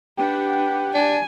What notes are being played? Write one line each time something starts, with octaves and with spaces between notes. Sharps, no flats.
D4 G4 B4 F#5 G5
D4 G#5